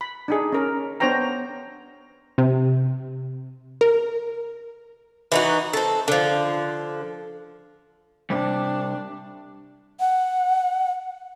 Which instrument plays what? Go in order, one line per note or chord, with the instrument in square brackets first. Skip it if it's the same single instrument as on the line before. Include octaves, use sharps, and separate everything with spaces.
[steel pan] B5
D4 D#4 G#4
C#4 A#4
B3 D4 C5 C#5 G5 A#5
[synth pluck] C3
A#4
[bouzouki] E3 D#4 F#4
C4 A4
D3 F3
[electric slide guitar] C3 G3 [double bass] D4
[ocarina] F#5